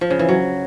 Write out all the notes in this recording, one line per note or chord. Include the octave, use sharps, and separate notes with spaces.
F3
C#3
E3
F#3